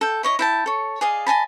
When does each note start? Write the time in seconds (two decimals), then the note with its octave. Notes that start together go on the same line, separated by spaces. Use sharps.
0.01 A4 G5
0.23 E4 C#5 D#5
0.39 E4 G5 A5
0.66 A4 C#5
1.01 G#4 D5 D#5 F5
1.27 D#5 G#5 A5 B5